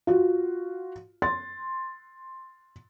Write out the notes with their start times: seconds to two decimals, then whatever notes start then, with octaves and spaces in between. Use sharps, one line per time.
0.07 F4 F#4
1.22 C6 A6